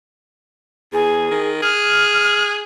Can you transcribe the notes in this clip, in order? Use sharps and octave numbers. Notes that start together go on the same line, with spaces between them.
E2 G#4
D#3
G#4 F6